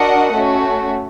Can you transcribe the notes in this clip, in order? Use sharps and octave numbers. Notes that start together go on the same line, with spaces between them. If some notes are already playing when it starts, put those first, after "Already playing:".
Already playing: D4 F#4 A#4 D#5 F#5
A3 C#4 F#4